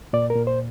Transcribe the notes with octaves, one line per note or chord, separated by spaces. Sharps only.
A#2 D5
A#4
A#2
C5